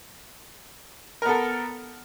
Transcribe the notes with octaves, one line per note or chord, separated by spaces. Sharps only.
B3 A4 A#4